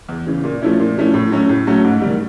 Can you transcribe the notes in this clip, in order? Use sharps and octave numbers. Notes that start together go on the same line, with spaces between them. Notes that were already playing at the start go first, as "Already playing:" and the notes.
E2
C#3 E3
A#2
F3 A3 C#4 E4
A#2
F3 A3 C#4 E4
A2
F#3 A3 C#4 F#4
A2
F#3 A3 C#4 F#4
G#2
D#3 G3